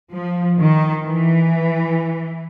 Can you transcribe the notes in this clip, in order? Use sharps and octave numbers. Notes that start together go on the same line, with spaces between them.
F3
D#3
E3